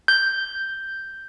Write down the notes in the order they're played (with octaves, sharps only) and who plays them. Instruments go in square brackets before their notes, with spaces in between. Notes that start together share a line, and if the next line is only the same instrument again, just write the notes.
[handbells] G6